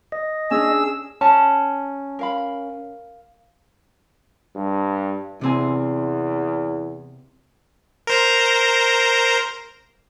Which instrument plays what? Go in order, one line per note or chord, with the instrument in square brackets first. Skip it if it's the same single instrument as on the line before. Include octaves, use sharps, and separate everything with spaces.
[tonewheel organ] D#5
[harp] C#4 D4 F6 [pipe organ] G#4 E6
[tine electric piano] C#4 [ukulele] A5
[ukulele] A#4 F5 B5
[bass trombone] G2
[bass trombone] E2 [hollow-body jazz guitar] C3 C4 G#5
[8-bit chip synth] A#4 C5 A#5